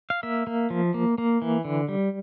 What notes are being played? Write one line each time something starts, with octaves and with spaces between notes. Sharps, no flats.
F5
A#3 E5
A#3
F3
A#3
A#3
E3
D3
G3